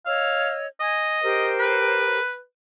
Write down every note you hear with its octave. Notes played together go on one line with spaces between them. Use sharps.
C#5 D#5 F5 E6
D#5 G#5
G4 A#4 C5
B4